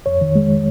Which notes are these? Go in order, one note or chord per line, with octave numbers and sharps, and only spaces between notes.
F2 C#5
D#3
G#3